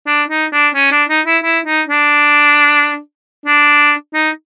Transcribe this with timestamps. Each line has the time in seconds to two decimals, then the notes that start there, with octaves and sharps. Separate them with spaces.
0.07 D4
0.30 D#4
0.53 D4
0.75 C#4
0.92 D4
1.09 D#4
1.26 E4
1.43 E4
1.66 D#4
1.88 D4
3.46 D4
4.14 D#4